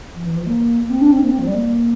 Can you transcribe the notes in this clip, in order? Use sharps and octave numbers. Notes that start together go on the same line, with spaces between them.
F3
E3
F3
A#3
A#3
C4
D4
C4
A#3
C4
F3
G3
A#3